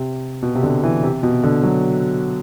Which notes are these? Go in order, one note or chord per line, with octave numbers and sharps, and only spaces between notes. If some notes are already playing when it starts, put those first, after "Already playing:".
Already playing: C3
B2
C3
D3
E3
C3
B2
D3
F#3